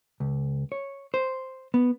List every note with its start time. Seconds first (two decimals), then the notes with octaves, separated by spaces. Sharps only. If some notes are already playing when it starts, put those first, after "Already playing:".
0.20 C#2
0.72 C#5
1.14 C5
1.74 B3